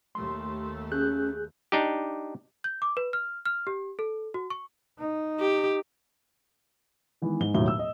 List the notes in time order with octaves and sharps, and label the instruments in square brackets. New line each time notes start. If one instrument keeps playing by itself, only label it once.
[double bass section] D#2 A3 [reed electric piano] C6
[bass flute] C#4 [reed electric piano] G#4 F#6 G6
[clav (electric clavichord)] D4 D#4 G4
[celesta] G6
D6
B4
F6
F6
G4
A4
F#4
C#6
[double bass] D#4
[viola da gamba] G4
[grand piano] D#3 E3 G#3 B3
G#2 G7
E1 D#2 A2 F#3 G7
E6
D#5